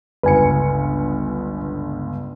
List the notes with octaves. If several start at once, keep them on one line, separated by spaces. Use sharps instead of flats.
G1 C#2 B4 G#5 C#7